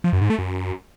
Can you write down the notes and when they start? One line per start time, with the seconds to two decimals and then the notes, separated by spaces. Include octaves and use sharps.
0.04 F3
0.13 F#2
0.21 G#2
0.30 A3
0.38 F#2